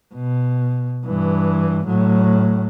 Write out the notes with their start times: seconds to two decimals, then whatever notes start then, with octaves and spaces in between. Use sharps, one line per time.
0.14 B2
1.07 G2 E3
1.86 A2 F#3